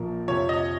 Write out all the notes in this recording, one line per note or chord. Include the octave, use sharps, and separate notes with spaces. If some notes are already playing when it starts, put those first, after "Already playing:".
Already playing: A#1 A#2 F3 A#3 A#4
F2 C3 F3 C#5
D#5